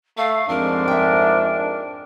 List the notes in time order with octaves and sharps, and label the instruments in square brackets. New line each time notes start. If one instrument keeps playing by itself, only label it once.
[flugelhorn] A3 [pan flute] F5
[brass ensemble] F2 G#2 [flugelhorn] D4 [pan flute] A#4
[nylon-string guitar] E5 G5